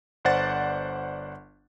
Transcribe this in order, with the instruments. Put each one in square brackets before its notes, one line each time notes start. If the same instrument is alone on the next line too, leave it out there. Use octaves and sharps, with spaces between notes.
[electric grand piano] G1 C5 D5 F#5 A6